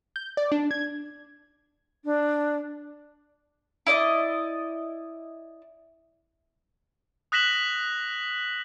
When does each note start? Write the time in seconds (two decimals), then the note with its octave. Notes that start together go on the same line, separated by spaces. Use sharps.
0.16 G6
0.37 D5
0.52 D4
0.71 G#6
2.05 D4
3.87 E4 D5 D#5
7.32 D#6 F#6 A#6 B6 E7 F#7